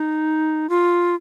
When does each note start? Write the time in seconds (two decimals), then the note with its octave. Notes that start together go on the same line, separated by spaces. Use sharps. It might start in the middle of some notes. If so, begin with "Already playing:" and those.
Already playing: D#4
0.69 F4